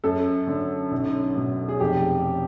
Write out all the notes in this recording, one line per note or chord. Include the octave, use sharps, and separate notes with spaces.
F#2 A4
D3
B1
B2
G#4
F1 G4